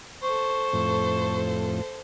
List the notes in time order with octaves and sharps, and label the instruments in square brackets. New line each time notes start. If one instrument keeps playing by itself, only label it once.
[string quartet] A4 C5 [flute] C#6
[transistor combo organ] F2 A2